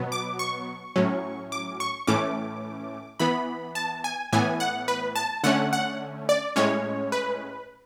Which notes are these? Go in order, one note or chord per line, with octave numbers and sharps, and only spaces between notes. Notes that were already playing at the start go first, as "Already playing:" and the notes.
Already playing: B2 F#3 B3
D6
C#6
A2 F#3 C#4
D6
C#6
A2 E3 A3 C#4 D6
E3 B3 B5
A5
G#5
A2 E3 B3 G#5
F#5
B4
A5
D3 A3 C#4 F#5
F#5
D5
A2 G#3 C#4 C#5
B4